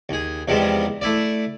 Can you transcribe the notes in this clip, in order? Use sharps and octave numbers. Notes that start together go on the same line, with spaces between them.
D#2 G#4
E2 C3 D#3 F3 G3 G#3
A3 E4 D5